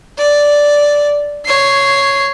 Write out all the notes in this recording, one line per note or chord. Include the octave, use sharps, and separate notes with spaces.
D5
C#5 C7